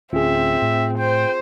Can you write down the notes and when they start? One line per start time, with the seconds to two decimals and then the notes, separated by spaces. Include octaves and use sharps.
0.13 D1 D2 C4 C#4 F4 G#4 E5
0.62 A2
0.98 C5 G5